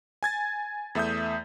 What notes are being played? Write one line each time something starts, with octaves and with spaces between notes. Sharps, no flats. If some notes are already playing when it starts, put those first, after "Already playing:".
G#5 G#6 A6
E2 A3 E5 D#6 G6